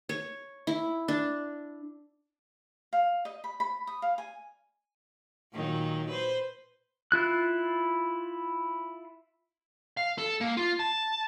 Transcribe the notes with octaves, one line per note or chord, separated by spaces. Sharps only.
C#5
E4
D4
F5
D#5
B5
B5
D#6
F5
G#5
A#2 D#3 F#3
B4 C5
E4 F4 F#6
F5
A4
A#3
F4
A5